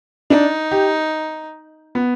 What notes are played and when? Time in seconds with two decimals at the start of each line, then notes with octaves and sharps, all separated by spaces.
0.30 D4 D#4
0.71 G4
1.95 B3